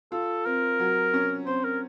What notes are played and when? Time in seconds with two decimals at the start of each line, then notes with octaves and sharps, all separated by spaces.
0.12 F4 A4
0.46 C4 A#4
0.80 F#3
1.14 C#4
1.47 C4 C5
1.65 A#4